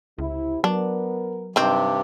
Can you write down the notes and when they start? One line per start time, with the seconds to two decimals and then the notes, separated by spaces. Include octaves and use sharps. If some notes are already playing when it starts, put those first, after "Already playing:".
0.19 C#2 C3 E4
0.64 F#3 B3 D4 A#4
1.56 G2 C3 D#3 C4